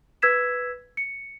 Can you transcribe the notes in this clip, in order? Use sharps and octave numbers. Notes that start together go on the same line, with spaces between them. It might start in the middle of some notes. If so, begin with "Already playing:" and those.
B4 E6 G#6 B6 E7
C#7